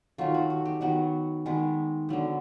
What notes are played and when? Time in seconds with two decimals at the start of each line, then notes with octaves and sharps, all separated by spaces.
0.18 D#3 F#3 A3 F4
0.34 F#4
0.50 F#4
0.65 G4
0.81 D#3 F#3 B3 F#4
1.46 D#3 G#3 B3
2.09 D3 F#3 B3